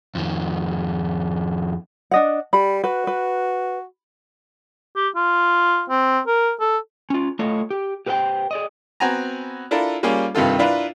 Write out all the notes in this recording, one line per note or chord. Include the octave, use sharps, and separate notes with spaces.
F2 D#3
D4 D#5 F#5
G3 B5
F#4 B4
B4
G4
F4
C4
A#4
A4
C#4 F4
A3 F4 C#5 D#5 F5
G4
G4 B4 C5 E5 G5
G#4 D5 D#5
B3 C4 F#4 G#5 A#5
D4 E4 F4 A4 A#4
G3 A#3 C#4 F4 G#4
G2 C3 D#3 F4 A4
D4 E4 F4 A#4 B4